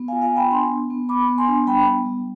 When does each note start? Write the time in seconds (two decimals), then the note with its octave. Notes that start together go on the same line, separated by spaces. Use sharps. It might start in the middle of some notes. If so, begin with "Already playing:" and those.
Already playing: B3
0.08 F5 G#5
0.12 F4
0.22 F5 G#5
0.32 B3 G5 B5
0.51 D4 G#5 C6
0.70 B3
0.90 B3
1.09 B3 B5 D6
1.29 B3
1.38 G#5 C6
1.48 D4
1.67 G3 G5 B5
1.86 B3
2.05 G3